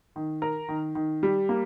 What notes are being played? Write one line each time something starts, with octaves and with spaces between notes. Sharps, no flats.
D#3
A#4
D#3
D#3
G3
A#3